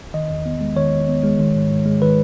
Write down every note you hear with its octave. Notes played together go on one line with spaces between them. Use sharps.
D#3 D#5
E2
B3
G#3
D#3 C#5
E2
B3
G#3
D#3
G#2
G#2
G#3
D#3 B4